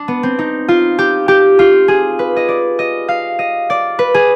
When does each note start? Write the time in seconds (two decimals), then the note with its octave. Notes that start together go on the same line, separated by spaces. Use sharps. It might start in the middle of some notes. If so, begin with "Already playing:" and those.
Already playing: D4
0.08 B3
0.23 C4
0.39 D#4
0.68 F4
0.99 G4
1.28 G4
1.59 F4
1.88 G#4
2.19 B4
2.36 D#5
2.48 D5
2.79 D#5
3.08 F5
3.39 D#5
3.70 D5
3.99 B4
4.14 G#4